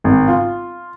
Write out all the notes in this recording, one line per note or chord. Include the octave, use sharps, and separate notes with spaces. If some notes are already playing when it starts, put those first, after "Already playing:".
G#1
F4